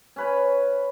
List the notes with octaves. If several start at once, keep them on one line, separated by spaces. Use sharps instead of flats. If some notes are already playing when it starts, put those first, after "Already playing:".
C#4 B4 C#5